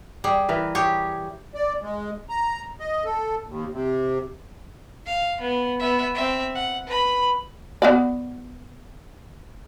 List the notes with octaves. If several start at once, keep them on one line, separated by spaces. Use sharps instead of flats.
G3 G#4
E3 A#4 B4
G4 G#4 C#5
D5
G#3
A#5
D#5
A4
D#2
C3
F5
B3
B3 E5
C4 E5
F#5
B4 B5
B3 F#4 D5